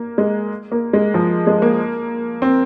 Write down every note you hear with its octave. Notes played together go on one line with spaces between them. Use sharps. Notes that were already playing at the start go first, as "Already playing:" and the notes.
Already playing: A#3
G#3
A#3
G#3
F3
G#3
A#3
C4